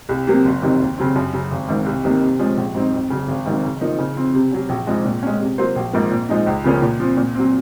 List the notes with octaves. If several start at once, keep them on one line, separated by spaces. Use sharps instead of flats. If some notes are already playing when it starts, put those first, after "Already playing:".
C2
C3 F#3 A#3
F#1
F2 C3 D#3 F#3
D#2
C#3 F#3 C4
F#2
C#3 F#3
G#1
G#2 D#3
C2
C3 D#3 A#3 D#4
C3
F3 G#3 C#4
A#1
G#2 F#3 C4 D#4
F2
C#3 F#3
G#1
G#2 D#3 F#3
C#3
F3 A#3 D#4
C#3
F3 C4
C3
F#3 C#4
A#1
G#2 F3 G#3
A#2
G#3 C#4
C3
F#3 A#3 F4 C5
A#1
G#2 F3 A#3
A#2
F3 G#3 D#4
C#2
C#3 F3 A#3 C#4
A#2
F3 C4
A#2
F#3 C4